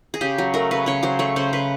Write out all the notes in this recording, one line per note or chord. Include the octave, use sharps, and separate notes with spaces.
G#4
C#3 G4
F#3
A3 A#4
C#3 B4
C#3 C#5
F#3 C5
A3 C#5
C#3 C5
C#3 B4